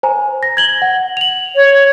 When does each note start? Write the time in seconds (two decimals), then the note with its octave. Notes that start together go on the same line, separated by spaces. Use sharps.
0.03 C5 G#5 A#5
0.43 A#6
0.57 G#6 F#7 G7
0.82 F#5
1.17 F7 F#7
1.56 C#5